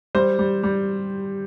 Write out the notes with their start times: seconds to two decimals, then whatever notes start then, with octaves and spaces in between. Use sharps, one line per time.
0.15 G3 C5
0.39 G3
0.63 G3